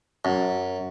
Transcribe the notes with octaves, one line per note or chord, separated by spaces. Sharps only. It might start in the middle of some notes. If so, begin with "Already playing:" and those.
F#2